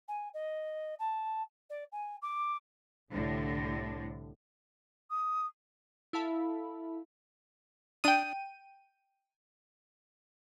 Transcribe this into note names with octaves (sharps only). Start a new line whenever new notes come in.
G#5
D#5
A5
D5
G#5
D6
C2 A2 D3
D#6
E4 A4 E5 F5 A5 B5
D4 G5 D#6 D#7